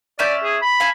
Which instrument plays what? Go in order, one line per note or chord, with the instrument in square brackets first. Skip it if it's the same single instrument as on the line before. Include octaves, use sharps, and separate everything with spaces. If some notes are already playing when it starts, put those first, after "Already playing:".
[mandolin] C#4 E5 G6 [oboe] D5
[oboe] G#4
B5
[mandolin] F5 G#5 A5